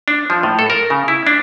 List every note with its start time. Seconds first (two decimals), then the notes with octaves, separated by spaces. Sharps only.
0.08 D4
0.30 F3
0.43 A2
0.59 A4
0.70 A#4
0.90 C#3
1.08 E4
1.27 D4